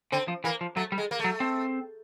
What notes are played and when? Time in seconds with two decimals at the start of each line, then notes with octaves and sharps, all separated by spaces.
0.12 D3 C4
0.28 F3
0.44 E3 A#3
0.61 F3
0.76 F#3 A3
0.92 G3
0.98 G#3
1.11 A#3
1.19 A3
1.24 F#3
1.40 C4